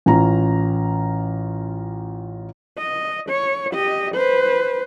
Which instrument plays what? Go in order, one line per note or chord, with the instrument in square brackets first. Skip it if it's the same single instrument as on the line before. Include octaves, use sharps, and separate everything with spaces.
[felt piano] A1 C#4 F4 A#5
[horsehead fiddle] D#5
C#5
G4 D#5
B4 C5